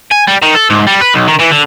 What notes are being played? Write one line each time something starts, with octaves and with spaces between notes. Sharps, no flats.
G#5
G3
D#3
A4
G#2
G3
B4
B1
D#3
E3
D3